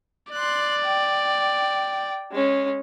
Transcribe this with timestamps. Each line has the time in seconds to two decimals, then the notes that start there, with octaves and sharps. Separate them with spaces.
0.32 D5 C6 F#6
0.84 G5
2.31 G#3 C#4